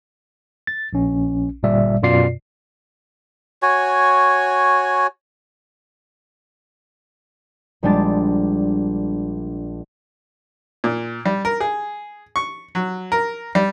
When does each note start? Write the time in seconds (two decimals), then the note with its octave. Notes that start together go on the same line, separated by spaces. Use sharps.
0.67 A6
0.93 A#1 C#4
1.63 G1 A#2 G3 D5 E5
2.03 F#2 B2 F4 D5 C7
3.62 F#4 C#5 G#5
7.83 A#1 G3 G#3 D4 A6
10.84 A#2
11.26 G3
11.45 A#4
11.60 G#4
12.36 C#6
12.75 F#3
13.12 A#4
13.55 G3